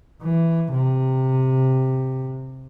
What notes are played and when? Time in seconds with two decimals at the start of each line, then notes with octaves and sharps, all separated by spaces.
0.23 E3
0.72 C3